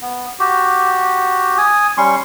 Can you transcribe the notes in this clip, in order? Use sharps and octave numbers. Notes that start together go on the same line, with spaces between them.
B3
F#4 G4
G#5 D#6
G3 C#4 C6 C#6